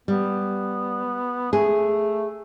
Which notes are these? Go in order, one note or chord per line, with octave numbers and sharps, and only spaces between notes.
G3 B3
A3 G#4